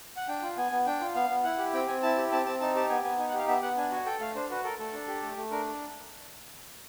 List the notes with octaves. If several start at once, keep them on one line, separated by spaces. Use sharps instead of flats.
F#5
D4 G5
F4
B3 G#5
B3
D4 G5
F4
B3 F5
B3
E4 F#5
G4
C4 G5
C4 G#5
E4 A5
G4
C4 A5
C4 A5
D#4 A5
G4 A5
B3 G#5
B3 G#5
D#4 G#5
F#5
G4 F5
B3 E5
B3 F#5
D4 G#5
F#4 G#5
A4 G5
A3 F5
D4 C5
F#4 B4
A4 A#4
A3 A4
D4
G4
A3
A3
D4 A#4